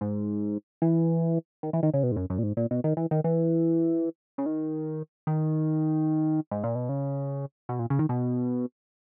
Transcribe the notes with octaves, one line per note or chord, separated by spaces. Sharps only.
G#2
E3
D#3
E3
D#3
C#3
B2
G#2
F#2
F#2
A#2
G#2
A#2
B2
D#3
E3
D#3
E3
C#3
D#3
D#3
G#2
A#2
B2
C#3
B2
A#2
C#3
D#3
B2